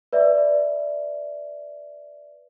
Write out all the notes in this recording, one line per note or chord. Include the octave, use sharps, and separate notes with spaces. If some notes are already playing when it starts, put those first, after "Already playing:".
B4 D5 E5